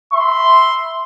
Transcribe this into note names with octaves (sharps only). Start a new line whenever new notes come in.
E5 B5 C6